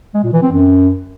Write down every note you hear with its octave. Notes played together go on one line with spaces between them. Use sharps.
G#3
A#2
E3
C4
F#2